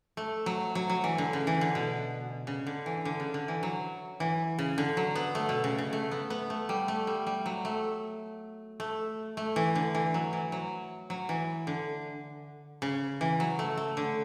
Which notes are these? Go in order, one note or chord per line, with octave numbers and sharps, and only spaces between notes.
A3
F#3
F#3
F#3
E3
D3
C#3
E3
D3
B2
C#3
D3
E3
D3
C#3
D3
E3
F#3
E3
C#3
D3
F#3
B3
A3
B2
C#3
C#3
A3
B3
B3
A3
G3
A3
G3
G3
F#3
A3
A3
A3
E3
D3
E3
F#3
E3
F#3
F#3
E3
D3
C#3
E3
F#3
A3
A3
D3